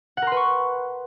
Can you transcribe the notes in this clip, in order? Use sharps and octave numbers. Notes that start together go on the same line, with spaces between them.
A#4 B4 F#5 C6 C#6